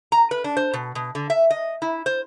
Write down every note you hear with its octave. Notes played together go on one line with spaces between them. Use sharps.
A#5
B4
D4
C5
B2
B2
D3
E5
D#5
E4
C5